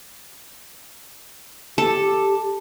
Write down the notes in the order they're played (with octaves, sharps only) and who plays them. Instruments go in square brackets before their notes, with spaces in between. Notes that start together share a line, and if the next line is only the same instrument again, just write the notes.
[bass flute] G4 [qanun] A4